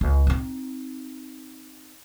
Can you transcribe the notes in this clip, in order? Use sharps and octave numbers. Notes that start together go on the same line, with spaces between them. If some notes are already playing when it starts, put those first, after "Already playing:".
C#2
C4 D#4